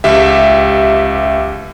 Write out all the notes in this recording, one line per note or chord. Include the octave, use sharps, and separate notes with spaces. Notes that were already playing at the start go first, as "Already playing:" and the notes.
C#2 G4 E5